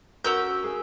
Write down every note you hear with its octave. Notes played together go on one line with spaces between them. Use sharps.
C#4 F#4 A#4 E6 G6
G#4